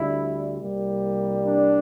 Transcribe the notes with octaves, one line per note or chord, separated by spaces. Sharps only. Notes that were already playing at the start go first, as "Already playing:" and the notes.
Already playing: D2 D3 G3 E4
C2 C3 G3 A#3
D4